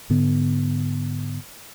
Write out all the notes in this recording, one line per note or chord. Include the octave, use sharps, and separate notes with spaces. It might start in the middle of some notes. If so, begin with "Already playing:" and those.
G#2 D3 B3